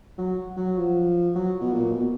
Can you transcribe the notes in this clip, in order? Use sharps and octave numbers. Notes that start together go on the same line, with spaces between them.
F#3
F#3
F3
F#3
B2
A#2
B2